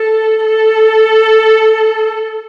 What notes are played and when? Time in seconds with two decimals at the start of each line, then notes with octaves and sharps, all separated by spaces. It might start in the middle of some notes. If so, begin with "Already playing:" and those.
Already playing: A4
0.45 A4